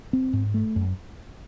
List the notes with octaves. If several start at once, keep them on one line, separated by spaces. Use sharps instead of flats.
C4
G#2
A3
F#2